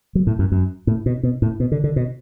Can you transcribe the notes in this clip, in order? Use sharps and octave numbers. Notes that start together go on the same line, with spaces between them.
F#3
A2
F#2
F#2
A2
B2
B2
A2
B2
D3
D3
B2